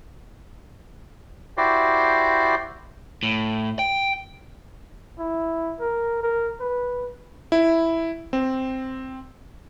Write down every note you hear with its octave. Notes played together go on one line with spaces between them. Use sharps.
E4 F#4 G4 C5 D5
A2
G5
E4
A#4
A#4
B4
E4
C4